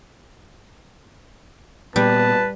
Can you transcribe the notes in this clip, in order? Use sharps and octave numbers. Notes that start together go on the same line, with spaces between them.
A#2 G3 B3 B4 A5